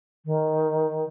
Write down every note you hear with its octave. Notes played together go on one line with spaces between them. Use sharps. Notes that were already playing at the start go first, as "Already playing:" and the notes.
D#3